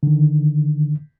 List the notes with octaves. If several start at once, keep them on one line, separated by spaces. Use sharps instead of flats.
D3 D#3